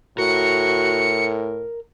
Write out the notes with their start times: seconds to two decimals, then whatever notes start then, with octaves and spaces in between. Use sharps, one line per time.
0.18 A2 F#4 A#4 C#7